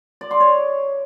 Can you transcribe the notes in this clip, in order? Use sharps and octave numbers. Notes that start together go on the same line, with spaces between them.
D5
C6
C#5